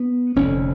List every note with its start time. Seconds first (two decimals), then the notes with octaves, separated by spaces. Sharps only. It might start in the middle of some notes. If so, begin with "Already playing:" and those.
Already playing: B3
0.36 F1 F2 D3 C#4